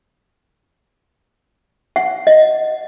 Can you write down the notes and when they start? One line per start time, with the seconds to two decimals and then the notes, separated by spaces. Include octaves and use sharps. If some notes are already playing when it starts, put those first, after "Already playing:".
1.96 F#5
2.27 D#5